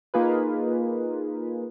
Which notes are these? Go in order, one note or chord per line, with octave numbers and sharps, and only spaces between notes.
A#3 D#4 F4 G#4 B4